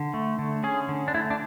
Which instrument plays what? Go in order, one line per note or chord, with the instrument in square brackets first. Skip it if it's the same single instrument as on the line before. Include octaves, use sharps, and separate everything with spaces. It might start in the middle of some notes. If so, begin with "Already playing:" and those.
Already playing: [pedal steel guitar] D3
A3
D3
C#4 G#4
D3
D4
A3 E4
D4